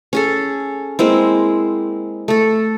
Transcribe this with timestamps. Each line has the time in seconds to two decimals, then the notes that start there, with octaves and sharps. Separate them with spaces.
0.13 C#4 G#4 A4
0.99 G#3 A#3 C4 E4
2.28 A3 A4